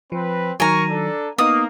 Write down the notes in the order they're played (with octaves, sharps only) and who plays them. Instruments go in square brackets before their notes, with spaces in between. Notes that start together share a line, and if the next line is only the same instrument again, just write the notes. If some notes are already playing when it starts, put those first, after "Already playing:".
[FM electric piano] F3 [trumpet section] C4 B4
[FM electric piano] D#3 F#3 [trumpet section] A#4 C#6 [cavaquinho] G#5 A#5
[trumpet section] D4 A4
[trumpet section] A#3 [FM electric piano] B3 D#4 [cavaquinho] D#6